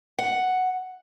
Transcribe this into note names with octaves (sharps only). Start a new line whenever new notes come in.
F#5